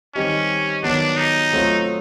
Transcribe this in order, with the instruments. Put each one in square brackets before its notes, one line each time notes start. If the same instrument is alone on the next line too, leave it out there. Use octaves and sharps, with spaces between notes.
[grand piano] D#3 G3 C4 D#4 G4 [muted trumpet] C#4
[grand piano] D#3 F#3 B3 [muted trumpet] D4
[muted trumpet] D#4
[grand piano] F#3 A3 C4 F4